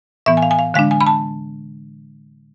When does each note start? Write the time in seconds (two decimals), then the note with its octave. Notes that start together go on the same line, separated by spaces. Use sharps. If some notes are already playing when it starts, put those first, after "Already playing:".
0.26 A2 E3 B3 E5
0.37 G#5
0.42 F5
0.51 G#5
0.59 F5
0.74 D3 G#3 D4 F5
0.91 G#5
1.01 B5
1.07 A5